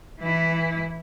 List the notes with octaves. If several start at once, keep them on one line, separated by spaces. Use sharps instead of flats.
E3 E4